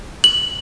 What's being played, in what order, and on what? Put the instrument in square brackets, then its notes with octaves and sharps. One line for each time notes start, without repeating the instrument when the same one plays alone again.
[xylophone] F#7